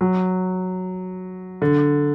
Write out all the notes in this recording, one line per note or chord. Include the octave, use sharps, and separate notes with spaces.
F#3
D3